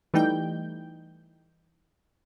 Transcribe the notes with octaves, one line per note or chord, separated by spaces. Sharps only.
E3 G3 A3 D#4 G5 G6